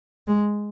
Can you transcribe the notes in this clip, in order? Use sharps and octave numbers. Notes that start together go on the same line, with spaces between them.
G#3